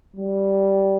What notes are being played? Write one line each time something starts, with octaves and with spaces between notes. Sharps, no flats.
G3